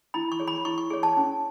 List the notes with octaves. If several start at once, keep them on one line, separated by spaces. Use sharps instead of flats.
E4 B5
C#6
G#4 C#5
B5
E4 C#6
C#6
G#4 C#5
A5
C#4